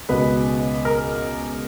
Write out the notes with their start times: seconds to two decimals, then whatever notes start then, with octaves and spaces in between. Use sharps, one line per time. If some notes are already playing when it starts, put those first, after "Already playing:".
0.09 C#2 B2 G#3 B4
0.85 A#4